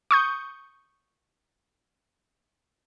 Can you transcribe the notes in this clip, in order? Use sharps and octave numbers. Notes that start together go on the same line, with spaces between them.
C#6 D#6 G6